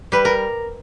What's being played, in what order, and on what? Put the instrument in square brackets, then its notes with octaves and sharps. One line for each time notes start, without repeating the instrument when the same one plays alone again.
[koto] G3 B4
A#4